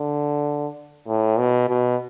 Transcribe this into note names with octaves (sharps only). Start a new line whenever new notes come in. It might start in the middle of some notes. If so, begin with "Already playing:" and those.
Already playing: D3
A2
B2
B2